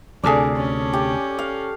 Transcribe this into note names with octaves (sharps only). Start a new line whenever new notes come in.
D2 C3 D4 G#4 A4 D5
C#4
G4
F5